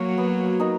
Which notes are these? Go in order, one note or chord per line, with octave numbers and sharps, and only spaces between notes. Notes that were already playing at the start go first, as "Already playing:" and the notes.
Already playing: F#3 A#3 F#4 C#5 F5
B3
D#4 A#4